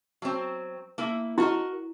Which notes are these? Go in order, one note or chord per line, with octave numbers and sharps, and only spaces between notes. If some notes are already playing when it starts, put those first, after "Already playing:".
F#3 C4
A#3 E4
E4 F#4 A#4 D#5